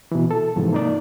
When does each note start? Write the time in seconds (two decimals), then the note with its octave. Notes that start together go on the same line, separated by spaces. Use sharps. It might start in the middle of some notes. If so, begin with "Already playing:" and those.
0.12 B2 E3
0.31 A4
0.56 G#2 C3 E3 F3
0.73 A#3 D#4 D5